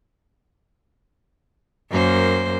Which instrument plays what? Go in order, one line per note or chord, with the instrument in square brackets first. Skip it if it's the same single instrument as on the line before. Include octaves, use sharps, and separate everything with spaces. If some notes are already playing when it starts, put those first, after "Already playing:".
[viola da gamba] F#2 A#3 C5